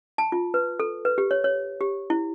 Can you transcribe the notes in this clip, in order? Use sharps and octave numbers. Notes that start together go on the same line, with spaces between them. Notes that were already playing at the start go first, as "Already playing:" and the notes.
A5
F4
B4
A4
B4
G4
C#5
C#5
G4
E4